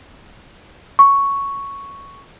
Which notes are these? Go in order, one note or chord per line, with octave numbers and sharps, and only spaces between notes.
C#6